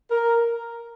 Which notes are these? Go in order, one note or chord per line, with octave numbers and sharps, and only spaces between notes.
A#4